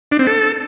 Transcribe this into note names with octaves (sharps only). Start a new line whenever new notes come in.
D4
C4
A4